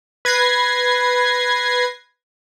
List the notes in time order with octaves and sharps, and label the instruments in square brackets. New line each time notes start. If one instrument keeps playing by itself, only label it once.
[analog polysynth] B4 G#6 A#6 C7